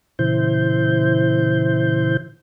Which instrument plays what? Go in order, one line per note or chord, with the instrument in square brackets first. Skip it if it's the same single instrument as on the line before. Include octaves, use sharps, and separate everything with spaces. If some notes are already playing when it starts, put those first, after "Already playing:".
[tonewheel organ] A#2 C#3 E3 E4 C5 G6